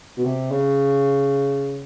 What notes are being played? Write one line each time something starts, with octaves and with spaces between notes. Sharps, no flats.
B2
C3
C#3